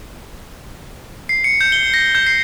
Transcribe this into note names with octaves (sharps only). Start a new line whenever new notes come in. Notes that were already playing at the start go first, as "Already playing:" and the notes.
C7
C#7
G6
G7
A#6
G6
C7